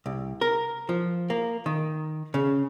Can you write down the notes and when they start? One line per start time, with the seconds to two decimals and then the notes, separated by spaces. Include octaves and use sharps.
0.06 C2
0.41 A#4
0.89 F3
1.30 A#3
1.66 D#3
2.34 C#3